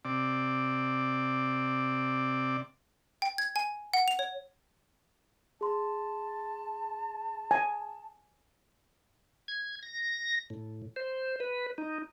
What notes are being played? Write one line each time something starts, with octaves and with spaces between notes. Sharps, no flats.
C3 D5
G5
G#6
G#5
F#5
F7
C#5
G#4 A5 C6
G#5
G#6
A#6
A2
C5
B4
D#4